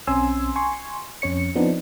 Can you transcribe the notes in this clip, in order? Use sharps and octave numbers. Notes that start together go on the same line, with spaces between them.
B1 C4 C#4 G#5 C6 E6
G#5 C6 C#6
F2 C#4 C#5 C#7
F3 B3 C4 D4 D#4